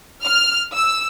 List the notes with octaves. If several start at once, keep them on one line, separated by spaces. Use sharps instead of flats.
F6
E6